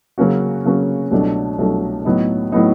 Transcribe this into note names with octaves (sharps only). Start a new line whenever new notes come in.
C#3 F#3 A#3 C#4 F#4
C#3 F#3 A#3 C#4 F#4
C2 B2 F#3 A3 D4
C2 B2 F#3 A3 D4
A2 F#3 B3 D#4
A2 F#3 B3 D#4